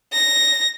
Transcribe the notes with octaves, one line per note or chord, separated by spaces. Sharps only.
A#6